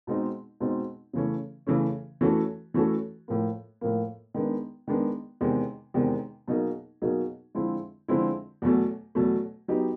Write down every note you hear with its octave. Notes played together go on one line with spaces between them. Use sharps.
B2 G#3 C4 D#4
B2 G#3 C4 D#4
C#3 E3 A3 C#4
C#3 E3 A3 C#4
E3 A3 C#4 F#4 A4
E3 A3 C#4 F#4 A4
A2 F3 A#3
A2 F3 A#3
D#3 G#3 B3 D4
D#3 G#3 B3 D4
E2 C3 D#3 G#3
E2 C3 D#3 G#3
B2 F#3 A#3 D#4 G#4
B2 F#3 A#3 D#4 G#4
D3 F3 G#3 C4 E4
D3 F3 G#3 C4 E4
E2 B2 F#3 A3
E2 B2 F#3 A3
F#3 B3 D#4 G4